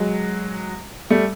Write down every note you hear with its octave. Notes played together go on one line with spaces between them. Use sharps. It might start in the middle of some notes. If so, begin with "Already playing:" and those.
Already playing: F#3 G#3
G3 A3